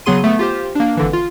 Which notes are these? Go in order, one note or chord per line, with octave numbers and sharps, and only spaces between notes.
C#3 F#3 B3 G#4 C6 D#7
A3 B3
F4 G4 C5
A#3 D4
G#1 D3 E3
F4